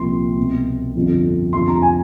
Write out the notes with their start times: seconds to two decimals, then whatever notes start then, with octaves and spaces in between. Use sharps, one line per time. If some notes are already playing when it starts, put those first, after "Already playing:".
Already playing: C2 A#2 F3 C6
0.37 C2 B2
0.96 G1 F2 D3 F3
1.53 F1 F2 D3 F3 C6
1.68 A#5
1.82 G#5